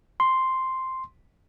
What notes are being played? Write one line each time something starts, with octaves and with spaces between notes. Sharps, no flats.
C6